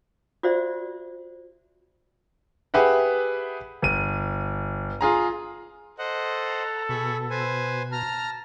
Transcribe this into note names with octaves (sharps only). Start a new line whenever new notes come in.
F4 F#4 C5 D5 E5
G4 G#4 B4 E5 F#5
G1 D#7
F4 G#4 A#5
A4 C5 D#5 F#5
A#5
B2 G#4 B5 C#6
B4 C5 G#5
A5 A#5 F6